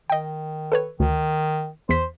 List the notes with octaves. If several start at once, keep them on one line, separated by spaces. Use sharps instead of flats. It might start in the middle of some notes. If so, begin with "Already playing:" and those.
D#3 D#5 G5
A4 B4 C#5
D2 D#3
E2 C5 B6